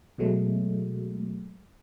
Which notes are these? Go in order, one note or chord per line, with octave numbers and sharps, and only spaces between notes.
B2 F#3 G#3 A3